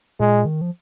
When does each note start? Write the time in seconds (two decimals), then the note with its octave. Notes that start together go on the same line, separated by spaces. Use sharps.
0.20 A#2 G#3
0.45 D#3
0.61 F3